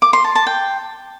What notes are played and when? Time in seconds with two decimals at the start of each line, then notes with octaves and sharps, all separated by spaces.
0.02 D6
0.13 C6
0.24 A5
0.35 A5
0.47 G5